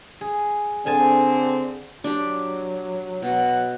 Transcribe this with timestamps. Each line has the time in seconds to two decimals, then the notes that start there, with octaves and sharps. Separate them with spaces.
0.21 G#4
0.86 D3 C4 G#4 G#5 A5
2.04 F#3 D4 G4
3.22 B2 F#5